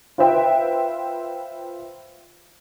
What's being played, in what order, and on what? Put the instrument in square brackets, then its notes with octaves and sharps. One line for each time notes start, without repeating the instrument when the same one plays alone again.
[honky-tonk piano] F4 B4 C5 E5 G5